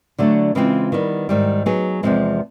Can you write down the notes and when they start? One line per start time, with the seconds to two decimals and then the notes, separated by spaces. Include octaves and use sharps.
0.18 D3 F#3 A3 D4
0.55 C#3 E3 G#3 C4 F4
0.92 D#3 G3 B3
1.29 G#2 D#3 G3
1.66 F#3 B3 D#4 G#4
2.03 E2 C3 F3 G#3 C4